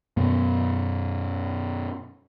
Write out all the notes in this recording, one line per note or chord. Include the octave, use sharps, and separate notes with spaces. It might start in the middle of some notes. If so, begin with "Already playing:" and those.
F#2 B2 B3